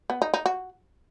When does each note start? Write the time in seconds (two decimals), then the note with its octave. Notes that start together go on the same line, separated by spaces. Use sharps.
0.10 B3
0.22 D#4
0.34 D#4
0.46 F#4